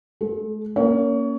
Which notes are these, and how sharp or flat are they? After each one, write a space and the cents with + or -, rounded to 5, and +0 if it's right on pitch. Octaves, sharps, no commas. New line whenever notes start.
G#3 +45 A4 -25
A#3 +0 C#4 +0 C#5 +30